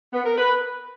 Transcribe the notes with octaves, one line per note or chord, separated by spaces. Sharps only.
B3
A#4
B4